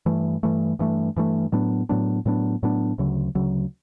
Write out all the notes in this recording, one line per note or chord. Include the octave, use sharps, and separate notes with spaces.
G2 E3 A3
G2 E3 A3
G2 E3 A3
G2 E3 A3
A2 F#3 B3 D4
A2 F#3 B3 D4
A2 F#3 B3 D4
A2 F#3 B3 D4
D2 C#3 F#3
D2 C#3 F#3